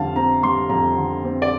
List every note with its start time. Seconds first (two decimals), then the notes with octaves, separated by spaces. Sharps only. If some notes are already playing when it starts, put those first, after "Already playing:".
Already playing: F2 D3 G3 F5 A5
0.16 C4 A#5
0.43 G3 C6
0.70 F2 A#5
0.96 D3
1.24 C4
1.42 D5